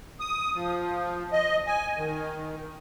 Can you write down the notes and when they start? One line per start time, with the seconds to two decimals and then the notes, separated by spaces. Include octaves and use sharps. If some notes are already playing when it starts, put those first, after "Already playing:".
0.20 D#6
0.54 F3
1.32 D#5
1.67 G#5
1.98 D#3